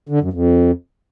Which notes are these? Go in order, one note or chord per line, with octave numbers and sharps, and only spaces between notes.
D3
F#2
F2